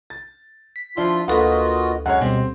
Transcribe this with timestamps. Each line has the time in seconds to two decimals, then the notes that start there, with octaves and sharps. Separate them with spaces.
0.10 A6
0.76 B6
0.97 F3 D4 E4 F4 C6
1.28 D2 A#3 F4 F#4 A4 B4 D#5
2.06 F#2 G#3 C#5 F#5
2.21 B2 G3 C4